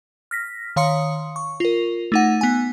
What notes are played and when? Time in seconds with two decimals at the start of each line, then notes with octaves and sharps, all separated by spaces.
0.31 F6 A#6 B6
0.76 D#3 C#5 F5 C6 D#6 C#7
1.36 C#6
1.60 F4 A#4
2.12 A3 D#4 F#5
2.41 B3 G#5